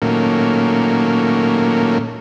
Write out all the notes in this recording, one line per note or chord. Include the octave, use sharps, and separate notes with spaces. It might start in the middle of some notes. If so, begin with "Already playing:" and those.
A#2 D#3 F#3 A3 A#3 C#4